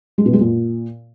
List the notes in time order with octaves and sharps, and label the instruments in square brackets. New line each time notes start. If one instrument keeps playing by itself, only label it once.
[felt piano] G#3
B2
G#3
A#2